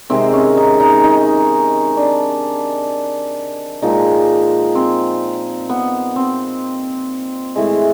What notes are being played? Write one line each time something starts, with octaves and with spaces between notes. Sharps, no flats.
C3 D#3 G#3 C4
C#4
D#4
D#4
D#4
D4
A#2 F3 G#3 D#4
C4
B3
C4
A2 E3 G#3